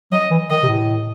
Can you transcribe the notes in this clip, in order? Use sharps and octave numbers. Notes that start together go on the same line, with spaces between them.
F#3 D#5
E3
D#3 D#5
C3
A2